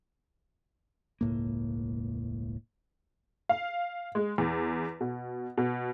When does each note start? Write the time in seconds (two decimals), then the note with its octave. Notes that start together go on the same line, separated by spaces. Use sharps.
1.21 E1 C#2 A2 A#3
3.49 F5
4.15 G#3
4.38 E2
5.01 B2
5.58 B2